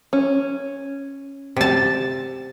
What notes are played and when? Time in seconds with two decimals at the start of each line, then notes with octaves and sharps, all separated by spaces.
0.13 C#4
1.57 C3 A5